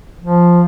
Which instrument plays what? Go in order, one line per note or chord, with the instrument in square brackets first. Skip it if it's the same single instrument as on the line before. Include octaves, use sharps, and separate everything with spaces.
[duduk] F3